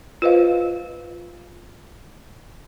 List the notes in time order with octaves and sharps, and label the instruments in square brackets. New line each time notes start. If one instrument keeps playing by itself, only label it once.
[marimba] F4 B4 C5 D#5 F5